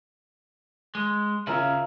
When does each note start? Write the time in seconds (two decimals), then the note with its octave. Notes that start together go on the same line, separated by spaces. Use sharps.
0.95 G#3
1.47 C#3 C#4 F4 A#4 E5